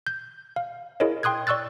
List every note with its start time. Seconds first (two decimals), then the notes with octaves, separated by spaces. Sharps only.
0.07 G6
0.56 F5
1.00 E4 G#4 A#4 C#5 D#5
1.23 G5 C6 D#6 F#6 G#6
1.47 D5 C#6 E6 F#6 A6